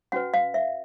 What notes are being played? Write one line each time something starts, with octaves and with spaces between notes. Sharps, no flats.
C#4 F#4 B4 F#5
F5
E5